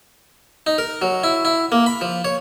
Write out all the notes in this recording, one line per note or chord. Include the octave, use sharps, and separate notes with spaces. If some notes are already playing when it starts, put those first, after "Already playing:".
D#4
A#4
F#3
E4
E4
A#3
B5
F3
C#5